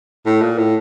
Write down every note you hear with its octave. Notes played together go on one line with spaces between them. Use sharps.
A2
A#2
A2